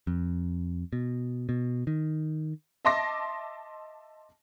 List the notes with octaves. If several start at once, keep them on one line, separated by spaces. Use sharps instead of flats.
F2
B2
B2
D#3
D#5 E5 A5 C6 D6 A#6